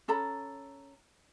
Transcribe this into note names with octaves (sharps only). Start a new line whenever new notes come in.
C#4 A4 A#5 B5